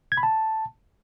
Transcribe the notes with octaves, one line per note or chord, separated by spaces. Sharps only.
G#6
B5
A5